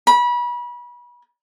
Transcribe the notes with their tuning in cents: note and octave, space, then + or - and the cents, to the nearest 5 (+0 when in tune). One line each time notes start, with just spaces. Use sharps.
B5 -30